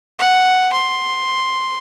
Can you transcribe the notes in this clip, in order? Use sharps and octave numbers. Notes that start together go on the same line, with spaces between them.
F#5
C6